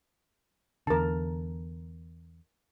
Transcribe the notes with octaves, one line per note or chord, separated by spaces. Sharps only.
E2 D3 A#4 A5